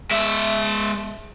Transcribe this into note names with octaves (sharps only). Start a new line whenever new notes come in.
G#3 E5